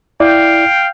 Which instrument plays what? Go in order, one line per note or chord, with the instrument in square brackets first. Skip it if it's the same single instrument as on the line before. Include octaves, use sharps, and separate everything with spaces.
[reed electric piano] E4 D5 [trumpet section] F5 G5